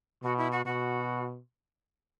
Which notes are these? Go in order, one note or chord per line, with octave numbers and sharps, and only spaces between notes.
B2 F#4
E4
F#4
B2 F#4